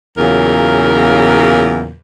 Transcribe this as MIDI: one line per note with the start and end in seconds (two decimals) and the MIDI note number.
0.18 1.93 40
0.18 1.93 46
0.18 1.93 49
0.18 1.93 54
0.18 1.93 70